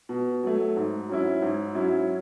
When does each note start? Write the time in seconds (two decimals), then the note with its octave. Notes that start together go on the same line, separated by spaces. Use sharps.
0.09 B2
0.43 F#3 A3
0.76 G#2
1.09 F#3 C#4 E4
1.42 G#2
1.75 F#3 C#4 E4